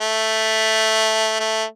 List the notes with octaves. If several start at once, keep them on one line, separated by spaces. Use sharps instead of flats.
A3
A3